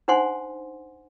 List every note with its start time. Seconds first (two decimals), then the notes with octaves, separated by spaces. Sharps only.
0.08 D4 D#4 C5 F#5 G#5 C6